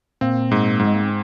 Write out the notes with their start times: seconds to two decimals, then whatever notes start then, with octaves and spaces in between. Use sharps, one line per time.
0.21 A#2 A#3 C4
0.51 G#2
0.79 G#2 F#3
0.87 G#3
0.94 A#3
1.02 C4